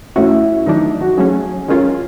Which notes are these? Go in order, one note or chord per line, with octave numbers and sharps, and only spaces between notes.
A2 F3 A3 C#4 E4 F#4
D#3 F#3 A3 D4 D#4
F#4
C#3 F#3 A3 C#4 G#4
D#3 G#3 C#4 F4 A#4